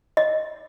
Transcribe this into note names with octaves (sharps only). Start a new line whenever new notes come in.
D#5